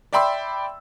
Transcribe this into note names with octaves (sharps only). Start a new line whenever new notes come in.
D5 E5 G5 B5 C6 E6